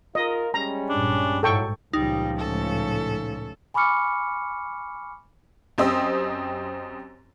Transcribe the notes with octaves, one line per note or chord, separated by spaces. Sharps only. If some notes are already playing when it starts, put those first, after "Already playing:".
F4 A#4 D#5
G3 G#3 C#4 A#5
A#1 G2 D4
G#2 F#3 D#4 E4 A4 G5 C#6
C#2 A#2 F3 G3 D#4
A2 C#4 A4
G#5 B5 C#6 D6 F6 C#7
F#2 C4 G4 C5 D#5 E6